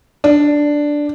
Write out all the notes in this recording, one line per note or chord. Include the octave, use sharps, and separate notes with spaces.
D4